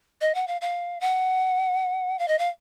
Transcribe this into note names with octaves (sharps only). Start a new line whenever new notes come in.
D#5
F#5
F5
F5
F#5
F5
D#5
F5